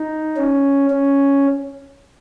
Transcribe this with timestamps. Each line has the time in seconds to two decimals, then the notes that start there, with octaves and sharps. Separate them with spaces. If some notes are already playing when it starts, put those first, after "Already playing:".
Already playing: D#4
0.37 C#4
0.90 C#4